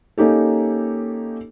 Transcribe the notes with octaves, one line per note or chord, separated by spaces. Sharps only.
A#3 C#4 D#4 G4 A4